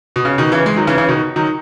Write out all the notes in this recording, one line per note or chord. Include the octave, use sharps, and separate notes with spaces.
B2
C#3
B2 D#3
C#3 E3
E3 G#3
D#3 F#3
C#3 E3
C#3 E3
B2 D#3
D#3 F#3